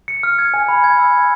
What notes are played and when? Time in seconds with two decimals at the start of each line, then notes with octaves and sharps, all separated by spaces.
0.08 C#7
0.23 F6
0.39 G#6
0.54 G#5
0.68 B5
0.84 G#6
0.99 E6
1.14 G#5